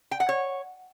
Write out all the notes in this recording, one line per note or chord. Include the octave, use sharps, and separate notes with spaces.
G5
F#5
C#5